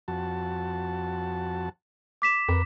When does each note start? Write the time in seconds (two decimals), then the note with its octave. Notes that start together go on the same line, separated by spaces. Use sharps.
0.08 F2 F#4 A5
2.22 D6 B6 E7
2.48 F2 A#4 B4